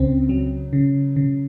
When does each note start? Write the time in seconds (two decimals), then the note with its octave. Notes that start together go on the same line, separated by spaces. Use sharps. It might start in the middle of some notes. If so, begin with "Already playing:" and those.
Already playing: C#2 C#3 C4
0.29 F#3
0.73 C#3
1.16 C#3